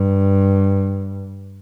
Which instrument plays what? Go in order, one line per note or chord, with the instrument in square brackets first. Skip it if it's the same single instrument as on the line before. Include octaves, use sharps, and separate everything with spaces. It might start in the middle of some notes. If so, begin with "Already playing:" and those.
Already playing: [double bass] G2